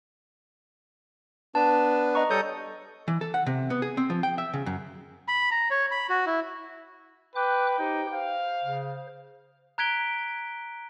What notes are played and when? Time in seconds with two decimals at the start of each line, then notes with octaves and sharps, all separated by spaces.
1.55 B3 D4 B4 A5
2.15 D#5 A#5 C#6
2.30 G3 A4 C#5 D#6 G6 C#7
3.08 E3
3.21 A4
3.34 F#5
3.46 C3
3.70 B3
3.82 G#4
3.97 C4
4.10 F3
4.23 G5
4.38 E5
4.54 C#3
4.66 F#2
5.28 B5
5.51 A#5
5.70 C#5
5.91 B5
6.09 F#4
6.26 E4
7.35 B4 G5 D6 F#6
7.79 D#4 G4 C5
8.13 C5 F5
8.63 C#3
9.78 A#5 F#6 G#6 B6 D7 G7